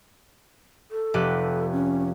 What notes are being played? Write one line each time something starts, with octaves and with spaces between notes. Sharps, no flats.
A4
F1 G4 B4
C#4